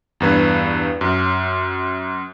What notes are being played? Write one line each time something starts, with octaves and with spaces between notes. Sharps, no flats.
E2 G2 B4 G#6
F#2